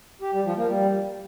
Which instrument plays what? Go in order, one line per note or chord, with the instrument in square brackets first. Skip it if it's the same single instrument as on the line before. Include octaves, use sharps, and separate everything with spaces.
[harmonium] G4
G3
F3
A#3
G3